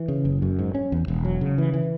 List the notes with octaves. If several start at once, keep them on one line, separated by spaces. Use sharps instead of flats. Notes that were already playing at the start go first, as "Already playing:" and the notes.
Already playing: E3
C#3
F#1
F#2
G#2
C#4
E2
E1
F#3
C#3
E3
E3